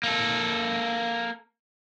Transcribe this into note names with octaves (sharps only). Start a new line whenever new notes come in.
A#3 A4